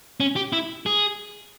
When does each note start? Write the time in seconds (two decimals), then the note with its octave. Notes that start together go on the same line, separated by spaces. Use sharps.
0.20 C#4
0.36 G4
0.53 E4
0.86 G#4